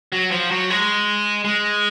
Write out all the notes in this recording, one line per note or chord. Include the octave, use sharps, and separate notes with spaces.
F#3
F3
F#3
G#3
G#3